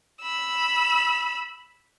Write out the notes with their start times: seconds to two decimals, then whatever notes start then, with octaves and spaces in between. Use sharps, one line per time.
0.23 B5 E6